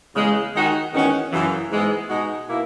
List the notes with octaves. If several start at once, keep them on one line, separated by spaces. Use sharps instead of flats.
E2 C#3 G#3
D#3 G#3 D#4 F#4
E2 D#3 G#3 C#4 F#4
F#2 C#3 E3
G#2 E3 G#3 B3
B2 G#3 D#4 F#4
B2 A#3 E4